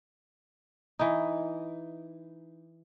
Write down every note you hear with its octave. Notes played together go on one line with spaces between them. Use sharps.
E3 D#4